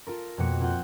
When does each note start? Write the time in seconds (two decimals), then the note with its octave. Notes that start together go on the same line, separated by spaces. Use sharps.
0.07 F4 A4 A#4
0.38 F2 B2 A#3 F#4 C#7
0.60 A#3 C4 F4 F#5 G6